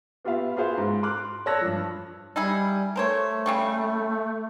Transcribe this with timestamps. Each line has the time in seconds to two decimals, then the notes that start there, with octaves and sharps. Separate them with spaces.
0.25 B3 F4 G4 E5 F5
0.57 F4 F#4 G#4 B4 C5 F5
0.77 G#2
1.03 C6 D6 F6 F#6
1.46 C#5 D5 A5 E6 F#6 A#6
1.61 G2 F3
2.36 G3 D#4 E4 G#4
2.96 A3 A#4 C5 C#5
3.46 C#3 G3 C#6